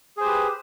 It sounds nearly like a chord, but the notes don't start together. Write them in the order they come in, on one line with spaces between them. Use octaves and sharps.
G#4 C5 G4 B4